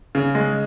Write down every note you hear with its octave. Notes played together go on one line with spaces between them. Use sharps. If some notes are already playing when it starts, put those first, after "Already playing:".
C#3
G#3